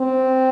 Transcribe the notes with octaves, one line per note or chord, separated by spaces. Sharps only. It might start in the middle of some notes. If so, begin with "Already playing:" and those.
Already playing: C4